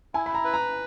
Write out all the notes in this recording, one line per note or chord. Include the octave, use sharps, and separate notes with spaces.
E4 G#5
B5
A#5
B4
A#5